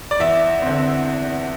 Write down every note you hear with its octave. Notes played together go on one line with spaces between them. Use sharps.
D5
E2 E5
D3 C4